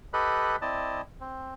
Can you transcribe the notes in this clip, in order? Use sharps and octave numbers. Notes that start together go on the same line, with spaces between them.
G4 A4 B4 D#5 B5 F#6
C4 E4 D5 D#5 A5
C4